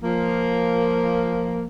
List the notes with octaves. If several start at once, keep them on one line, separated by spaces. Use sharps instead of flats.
F3 A#3